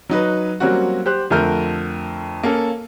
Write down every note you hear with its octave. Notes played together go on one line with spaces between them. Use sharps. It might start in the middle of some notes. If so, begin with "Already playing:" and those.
F#3 D#4 B4
F#3 G3 A#3 C4 C#4 F#4
G4 C5 F#6
F2 D3 A3 A#4 F6 G6
A#3 C#4 A4